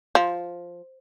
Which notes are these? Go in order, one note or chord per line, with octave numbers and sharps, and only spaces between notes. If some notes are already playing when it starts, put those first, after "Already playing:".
F3